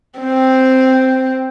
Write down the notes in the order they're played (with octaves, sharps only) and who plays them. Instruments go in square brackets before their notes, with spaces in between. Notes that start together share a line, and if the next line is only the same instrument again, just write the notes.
[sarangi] C4